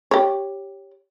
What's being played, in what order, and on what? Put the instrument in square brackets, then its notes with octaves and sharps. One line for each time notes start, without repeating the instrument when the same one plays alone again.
[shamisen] G4 C#5